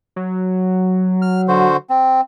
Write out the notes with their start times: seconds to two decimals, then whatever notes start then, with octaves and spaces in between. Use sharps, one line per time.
0.16 F#3
1.22 F6
1.48 D3 F#4 C5
1.90 C4